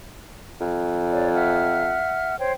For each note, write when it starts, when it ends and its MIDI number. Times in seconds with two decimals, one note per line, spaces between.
0.61 1.99 41
1.12 1.30 73
1.12 1.30 74
1.34 2.38 76
1.34 2.38 78
1.34 2.38 89
2.39 2.51 72
2.39 2.51 73
2.39 2.51 79